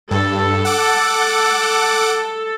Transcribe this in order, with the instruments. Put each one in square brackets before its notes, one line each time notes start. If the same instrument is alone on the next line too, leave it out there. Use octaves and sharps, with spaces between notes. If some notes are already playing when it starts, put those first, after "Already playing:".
[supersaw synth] G2 [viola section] A4
[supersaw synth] F#5 D6